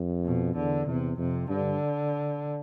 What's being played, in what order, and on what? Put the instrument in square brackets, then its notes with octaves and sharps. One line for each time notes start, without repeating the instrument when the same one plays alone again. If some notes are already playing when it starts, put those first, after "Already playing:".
Already playing: [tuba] F2
[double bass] B2
[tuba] E2 [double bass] D3
[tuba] E2 [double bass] C3
[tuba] F2 [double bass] C3
[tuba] G2 [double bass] D3